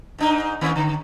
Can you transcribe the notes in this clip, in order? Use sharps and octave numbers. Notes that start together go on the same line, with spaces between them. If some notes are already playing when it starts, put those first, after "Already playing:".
G#2 D4 D#4
D#3 A#3 C#4
D3